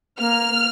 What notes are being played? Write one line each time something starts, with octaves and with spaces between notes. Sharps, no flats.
A#3 F6